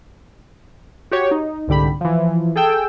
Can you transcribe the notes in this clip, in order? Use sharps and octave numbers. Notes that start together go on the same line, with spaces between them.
F#4 G4 C#5
D#4
C2 G#2 D3 G4 B5
E3 F3
G#4 A4 G5 E6